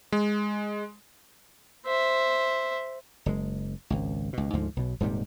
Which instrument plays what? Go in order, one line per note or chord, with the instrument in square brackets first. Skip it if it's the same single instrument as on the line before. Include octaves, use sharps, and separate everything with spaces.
[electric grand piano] G#3
[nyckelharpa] C5 E5
[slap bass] F#1 B2 G#3
G#1 C#2
C#2 B2
D2 G#2 D3 F3
B1 B2
D#1 G#2 C3 G3